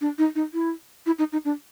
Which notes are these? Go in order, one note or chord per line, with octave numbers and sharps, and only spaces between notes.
D4
D#4
D#4
E4
E4
D#4
D#4
D4